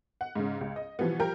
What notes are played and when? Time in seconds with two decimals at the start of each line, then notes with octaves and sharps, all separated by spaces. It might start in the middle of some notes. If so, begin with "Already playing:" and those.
0.21 F#5
0.36 G#2 C#3
0.61 C#2
0.76 D#5
0.99 B2 E3 F3 G3 B3
1.19 F3 G3 A#4 G5 A#5